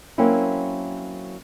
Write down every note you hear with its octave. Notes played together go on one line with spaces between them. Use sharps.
F#3 A#3 C4 C#4 E4